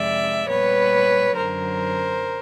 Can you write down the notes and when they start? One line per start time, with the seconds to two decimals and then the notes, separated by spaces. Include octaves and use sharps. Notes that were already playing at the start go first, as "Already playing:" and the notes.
Already playing: F2 C3 D#3 G#3 D5 E5
0.48 A#2 G3 B3 B4 C#5
1.36 F#2 D3 F#3 A#4 C5